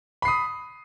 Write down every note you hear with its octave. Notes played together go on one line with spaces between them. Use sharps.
B5 D#6 C7